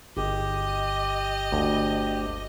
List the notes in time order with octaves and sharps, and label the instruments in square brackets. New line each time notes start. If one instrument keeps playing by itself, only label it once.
[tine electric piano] G1 [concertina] G4 [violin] D#5
[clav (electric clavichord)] D2